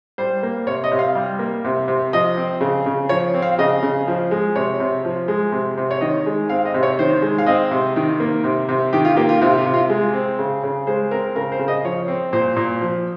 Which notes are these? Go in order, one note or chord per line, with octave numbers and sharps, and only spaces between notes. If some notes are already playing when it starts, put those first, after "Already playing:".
G3 C5
A#3
C3 C#5
D#5
C3
F5
G3
A#3
C3
C3
F3 D#5
C4
C#3
C#3
F3 C#5
C4
F5
C#3 D#5
C#3
F3
G#3
C3 C#5
C3
F3
G#3
C3
C3
C#5
D#3 D#5
G#3
C4 F5
D#5
C3
C#5
D#3 C5
G#3
F5
C4 D#5
C3
D#3
A#3
C3
C3
D#3 G4
F4
A#3 G4
F4
C3 F4
F4
C3
F4
G#3
C4
C#3
C#3
G#3 C5
C4 A#4
C#3 A#4
C5
C#3
D#5
F3 C#5
C4
A#2 C5
A#2
F3